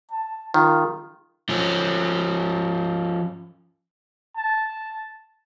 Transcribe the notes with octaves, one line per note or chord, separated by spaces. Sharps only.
A5
D#3 F4
F3 C#4
A5